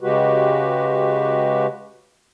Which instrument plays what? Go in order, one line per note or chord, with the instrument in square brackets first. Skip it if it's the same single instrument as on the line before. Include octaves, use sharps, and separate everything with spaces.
[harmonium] C#3 G#3 F#4 G4 B4